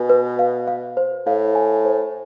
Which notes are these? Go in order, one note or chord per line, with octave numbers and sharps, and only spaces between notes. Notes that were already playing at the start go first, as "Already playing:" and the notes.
Already playing: B2 G#5
B4
F5
F5
C5
A2 F5
G#5
C5